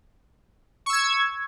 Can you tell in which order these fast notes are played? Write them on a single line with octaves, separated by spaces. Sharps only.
C#6 E6 G#6